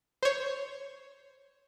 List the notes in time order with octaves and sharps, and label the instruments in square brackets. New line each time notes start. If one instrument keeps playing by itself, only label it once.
[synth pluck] C5 C#5